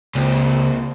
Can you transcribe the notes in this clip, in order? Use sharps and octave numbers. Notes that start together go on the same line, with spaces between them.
C#2 A#2 C4